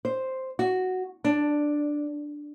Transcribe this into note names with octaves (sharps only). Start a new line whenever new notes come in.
C5
F#4
D4